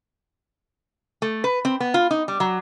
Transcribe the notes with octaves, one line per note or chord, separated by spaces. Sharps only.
A3
B4
C4
B3
F4
D#4
G3
F#3